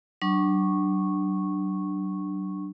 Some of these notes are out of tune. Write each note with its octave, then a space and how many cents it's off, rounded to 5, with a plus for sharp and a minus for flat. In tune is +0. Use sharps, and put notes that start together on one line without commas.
F#3 +35 D4 +15 C#6 -10